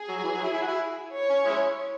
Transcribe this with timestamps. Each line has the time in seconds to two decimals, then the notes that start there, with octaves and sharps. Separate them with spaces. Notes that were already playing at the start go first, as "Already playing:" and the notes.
Already playing: G#4
0.08 F#3
0.19 F#3
0.24 E3
0.34 F#3
0.43 E4
0.53 E4
0.62 F#4
0.68 E4
1.15 C#5
1.29 C#4
1.45 G#3 C#4 E4